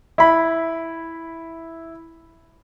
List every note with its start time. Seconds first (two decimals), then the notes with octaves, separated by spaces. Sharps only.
0.18 E4 B5